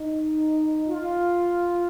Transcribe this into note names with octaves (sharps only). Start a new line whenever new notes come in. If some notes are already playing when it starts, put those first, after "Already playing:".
Already playing: D#4
F4